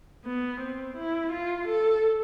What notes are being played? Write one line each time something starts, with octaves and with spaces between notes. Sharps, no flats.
B3
C4
E4
F4
A4